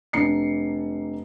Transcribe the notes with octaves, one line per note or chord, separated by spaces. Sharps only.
F1 D4 A#5 C7 C#7